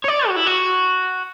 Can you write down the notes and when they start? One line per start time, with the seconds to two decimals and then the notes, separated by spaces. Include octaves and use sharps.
0.04 C#5
0.08 D5
0.28 F#4
0.36 E4
0.47 F#4